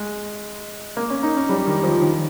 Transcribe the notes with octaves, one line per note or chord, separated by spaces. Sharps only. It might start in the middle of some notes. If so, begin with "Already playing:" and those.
Already playing: G#3
A#3
C#4
D#4
C#4
G3
D#3
F3
D#3